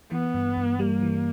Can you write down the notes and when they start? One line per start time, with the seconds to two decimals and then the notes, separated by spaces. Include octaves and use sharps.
0.12 E3 B3
0.34 G2
0.57 G2
0.79 G3 A#3
1.02 E3